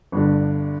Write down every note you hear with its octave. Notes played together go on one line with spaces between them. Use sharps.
G1 G2 D3